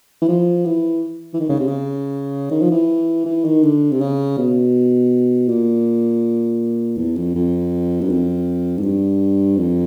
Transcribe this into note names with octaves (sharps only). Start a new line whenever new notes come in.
E3
F3
E3
E3
D#3
C#3
C3
C#3
D#3
F3
E3
E3
D#3
D3
C3
C#3
B2
A#2
E2
F2
F2
F#2
F2
G#2
G2
F2